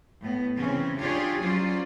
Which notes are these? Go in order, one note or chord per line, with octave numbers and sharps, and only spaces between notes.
A2 B3
C#3 E3 C4 C#4
D4 F4 G4 G#4 C#5 D5
F#3 C#4 F4 C5 D5